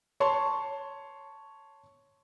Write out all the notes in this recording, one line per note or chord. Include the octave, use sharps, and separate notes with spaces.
C#5 A5 C6 C#6